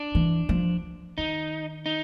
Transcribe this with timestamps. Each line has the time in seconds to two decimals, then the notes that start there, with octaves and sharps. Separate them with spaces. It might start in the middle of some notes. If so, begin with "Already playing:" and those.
Already playing: D4
0.15 E3
0.49 F3
1.18 D#3 D#4
1.86 D#4